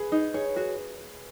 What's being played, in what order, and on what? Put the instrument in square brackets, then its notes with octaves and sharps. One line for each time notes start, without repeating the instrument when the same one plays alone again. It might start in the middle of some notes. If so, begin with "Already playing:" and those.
Already playing: [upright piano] G#4 B4
[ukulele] D#4
[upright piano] G#4 [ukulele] C#5
[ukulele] F#4 [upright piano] G#4